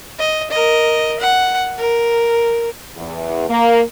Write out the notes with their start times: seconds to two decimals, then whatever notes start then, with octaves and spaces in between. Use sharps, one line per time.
0.18 D#5
0.51 A#4 D#5
1.20 F#5
1.78 A#4
2.96 E2
3.49 A#3